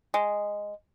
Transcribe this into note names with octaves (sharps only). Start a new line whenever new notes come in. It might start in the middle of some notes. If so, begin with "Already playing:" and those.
G#3